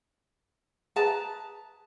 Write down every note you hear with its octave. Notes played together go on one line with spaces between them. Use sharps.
G#4 B4 A5 A#5